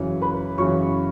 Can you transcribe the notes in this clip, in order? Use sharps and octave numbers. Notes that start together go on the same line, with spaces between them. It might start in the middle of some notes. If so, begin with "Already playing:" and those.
Already playing: F#2 C#3 E3 C#5
B4 B5
F#2 C#3 E3 C#5 C#6